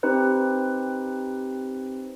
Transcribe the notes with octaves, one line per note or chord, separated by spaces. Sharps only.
C4 D#4 G4 B4 C5